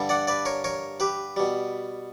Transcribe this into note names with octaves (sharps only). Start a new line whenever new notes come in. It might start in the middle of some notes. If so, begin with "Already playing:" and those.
Already playing: G2 D3 G3
D5 F#5
B4 D5
A#4 C#5
A#4 C#5
G4 B4
B2 G3